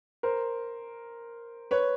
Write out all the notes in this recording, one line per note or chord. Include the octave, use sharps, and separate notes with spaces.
A#4 C5
B4 C#5